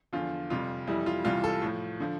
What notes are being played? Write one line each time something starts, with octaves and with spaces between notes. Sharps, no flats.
E2 D3 F3 F4
F2 C3 G3 F4
F2 E3 G3 E4
F4
C2 C3 E3 G3 F4
A4
A2 F3
D3 F3